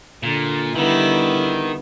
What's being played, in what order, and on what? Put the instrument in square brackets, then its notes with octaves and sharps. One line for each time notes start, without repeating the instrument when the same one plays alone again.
[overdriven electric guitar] A#2 [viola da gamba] D3
[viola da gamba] D3 G3 E4 [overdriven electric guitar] D#3 [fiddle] B3